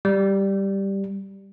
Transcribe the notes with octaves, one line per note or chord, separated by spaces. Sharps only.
G3